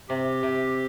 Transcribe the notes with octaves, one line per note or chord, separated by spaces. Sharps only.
C3 G4
C3